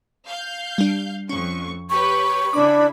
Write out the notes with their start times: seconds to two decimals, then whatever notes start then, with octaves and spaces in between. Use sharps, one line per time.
0.26 F5 G6
0.78 G3 D4
1.29 F2 C#4 C#6
1.90 G4 B4 C#5 C#6
2.53 C#3 D4 E4 B5 D6